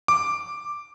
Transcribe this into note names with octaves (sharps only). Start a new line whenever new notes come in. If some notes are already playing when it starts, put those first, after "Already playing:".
D6